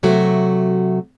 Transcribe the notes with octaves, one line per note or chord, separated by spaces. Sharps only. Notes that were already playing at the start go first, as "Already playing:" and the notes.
C3 F#3 A3 F#4